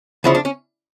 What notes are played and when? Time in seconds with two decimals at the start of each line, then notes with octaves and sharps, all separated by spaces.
0.24 D2 C#3 F3 E4
0.35 D4
0.45 C#4